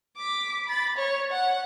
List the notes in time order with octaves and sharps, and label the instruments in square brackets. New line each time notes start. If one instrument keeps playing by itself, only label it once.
[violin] D6 B6
B5 A6
C#5
F#5